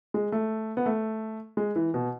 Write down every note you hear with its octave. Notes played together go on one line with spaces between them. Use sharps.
G#3
A3
B3
A3
G#3
E3
B2